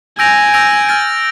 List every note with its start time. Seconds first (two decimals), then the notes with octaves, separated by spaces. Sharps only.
0.19 G#5 E6 G6 A#6 D7 F7
0.54 E6 G6 A#6 D7 F7
0.89 F6 A6 D7